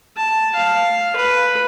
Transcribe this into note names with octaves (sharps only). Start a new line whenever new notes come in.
A5
F5
B4